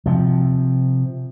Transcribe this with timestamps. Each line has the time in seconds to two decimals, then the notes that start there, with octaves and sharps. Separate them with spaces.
0.06 C3 F3